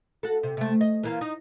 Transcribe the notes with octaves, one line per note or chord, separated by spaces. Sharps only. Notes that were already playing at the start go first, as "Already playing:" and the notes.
F#4 A4
C3
C3 A3
D#5
E3 A#3 F4
D#4